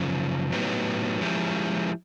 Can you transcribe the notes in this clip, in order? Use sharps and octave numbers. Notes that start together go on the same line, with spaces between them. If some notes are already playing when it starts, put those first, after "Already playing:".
Already playing: F#2 C#3 F3
A2 F#3 B3 D#4 G4
F3 G#3 C#4 E4 G4